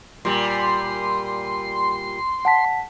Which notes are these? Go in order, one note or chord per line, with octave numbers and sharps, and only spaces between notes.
A#2 G3 C6
F#5 A5 B6